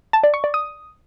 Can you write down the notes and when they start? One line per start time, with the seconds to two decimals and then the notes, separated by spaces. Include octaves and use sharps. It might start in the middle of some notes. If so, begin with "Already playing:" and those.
0.13 A5
0.23 D5
0.34 C#6
0.44 D5
0.54 D#6